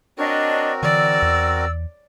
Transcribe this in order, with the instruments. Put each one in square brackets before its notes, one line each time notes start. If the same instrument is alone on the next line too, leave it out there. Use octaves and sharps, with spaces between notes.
[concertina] C4 F#4 A#4 [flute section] D4 D#5 [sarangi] C#5
[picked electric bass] D3 E3 [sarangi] D5 [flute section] E6
[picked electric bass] E2